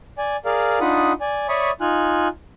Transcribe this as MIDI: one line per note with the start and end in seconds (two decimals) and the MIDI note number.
0.18 0.37 74
0.18 0.37 80
0.45 0.79 68
0.45 0.79 70
0.45 0.79 74
0.45 0.79 77
0.81 1.13 62
0.81 1.13 63
0.81 1.13 65
0.81 1.13 78
0.81 1.13 83
0.81 1.13 87
1.21 1.47 74
1.21 1.47 80
1.49 1.71 73
1.49 1.71 74
1.49 1.71 76
1.49 1.71 83
1.49 1.71 85
1.49 1.71 87
1.81 2.28 63
1.81 2.28 65
1.81 2.28 80
1.81 2.28 89
1.81 2.28 90